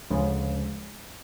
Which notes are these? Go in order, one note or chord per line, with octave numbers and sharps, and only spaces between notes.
D2 C#3 F3 G#3